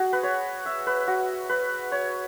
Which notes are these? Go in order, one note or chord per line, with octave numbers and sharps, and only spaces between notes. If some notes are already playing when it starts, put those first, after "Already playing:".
Already playing: F#4 G#4
B4
C#5
E5
B4
F#4
B4
C#5